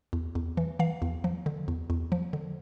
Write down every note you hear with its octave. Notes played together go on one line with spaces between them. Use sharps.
E2
E2
E3
E3 F5
E2
F3
D3
E2
E2
F3
D3